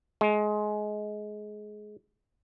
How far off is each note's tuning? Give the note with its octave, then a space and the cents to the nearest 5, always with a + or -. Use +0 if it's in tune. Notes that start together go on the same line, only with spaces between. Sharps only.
G#3 +20